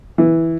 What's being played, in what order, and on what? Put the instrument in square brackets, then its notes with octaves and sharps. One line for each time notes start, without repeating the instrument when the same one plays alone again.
[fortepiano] E3